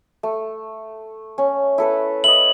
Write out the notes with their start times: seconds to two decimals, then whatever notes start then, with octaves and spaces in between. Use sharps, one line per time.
0.23 A3
1.38 C#4
1.78 E4 A4 B4
2.24 E4 B4 D#5 F#7